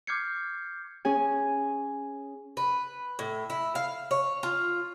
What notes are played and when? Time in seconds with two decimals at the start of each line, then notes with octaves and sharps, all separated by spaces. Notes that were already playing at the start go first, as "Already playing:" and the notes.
0.07 D6 F6 G6 G#6 C7 C#7
1.05 C#4 G#4 G#5
2.57 B4
3.19 A2
3.50 E4
3.75 F5
4.11 C#5
4.43 F4